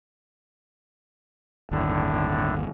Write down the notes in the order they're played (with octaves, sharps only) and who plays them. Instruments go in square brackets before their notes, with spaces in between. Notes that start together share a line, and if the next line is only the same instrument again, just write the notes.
[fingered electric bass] G1 D#2 [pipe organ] A2 D3 D4